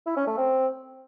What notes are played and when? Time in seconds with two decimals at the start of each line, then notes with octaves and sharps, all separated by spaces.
0.06 E4
0.17 C#4
0.27 A3
0.37 C4